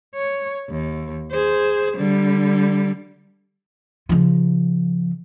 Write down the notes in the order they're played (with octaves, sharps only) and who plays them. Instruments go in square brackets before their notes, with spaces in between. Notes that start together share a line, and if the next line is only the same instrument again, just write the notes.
[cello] C#5
D#2
G#4 C5
D3 G3
[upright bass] C#3 F3